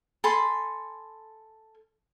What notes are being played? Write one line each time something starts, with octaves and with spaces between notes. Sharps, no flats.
A4 G#5 B5 C6